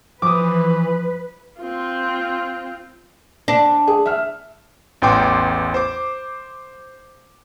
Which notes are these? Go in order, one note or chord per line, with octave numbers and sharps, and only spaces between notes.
E3 F3 B4 D6 D#6
C4 F4
D4
G#4
E5 F6
A1 E2 G5 C6 D6
C5 D6